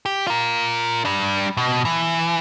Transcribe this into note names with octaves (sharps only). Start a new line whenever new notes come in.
G4
F4 A#4
G3 D4
B2
E3